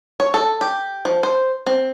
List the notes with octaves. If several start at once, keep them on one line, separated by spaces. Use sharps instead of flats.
C#5
A4
G4
F3
C5
C4